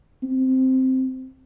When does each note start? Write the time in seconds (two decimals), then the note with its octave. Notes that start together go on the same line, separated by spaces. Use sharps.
0.23 C4